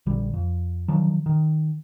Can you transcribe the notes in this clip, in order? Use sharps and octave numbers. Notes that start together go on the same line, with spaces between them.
A#1 D3 G3
F2
D3 D#3 F3 F#3
D#3